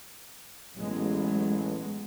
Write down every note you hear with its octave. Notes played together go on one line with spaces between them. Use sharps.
A1 F#3 G#3 B3